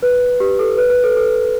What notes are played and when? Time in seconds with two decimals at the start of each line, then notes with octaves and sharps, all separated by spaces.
0.02 B4
0.40 G4
0.59 A4
0.78 B4
0.90 B4
1.04 A4
1.16 A4